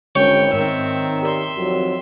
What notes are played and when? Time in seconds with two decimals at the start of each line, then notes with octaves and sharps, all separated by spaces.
0.16 G#1 D3 G#3 C#4 C#5 G5
0.53 G#2 D#3 C4 E5
1.22 G4 A#4 D5 E5 C6
1.56 F2 D#3 F#3